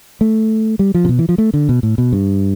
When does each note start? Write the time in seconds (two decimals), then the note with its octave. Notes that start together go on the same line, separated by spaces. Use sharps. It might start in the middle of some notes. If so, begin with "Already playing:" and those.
0.21 A3
0.79 G3
0.94 F3
1.05 C3
1.09 B2
1.19 E3
1.29 F3
1.38 A3
1.54 D3
1.69 B2
1.83 A2
1.98 B2
2.13 G2